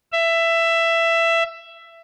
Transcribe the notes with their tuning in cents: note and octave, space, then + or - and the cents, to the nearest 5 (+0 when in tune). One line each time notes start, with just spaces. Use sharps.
E5 +15